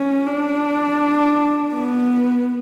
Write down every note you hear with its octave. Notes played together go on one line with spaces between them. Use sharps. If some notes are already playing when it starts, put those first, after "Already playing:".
Already playing: C#4
D4
B3